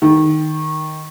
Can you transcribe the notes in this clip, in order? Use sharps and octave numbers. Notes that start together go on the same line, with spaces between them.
D#3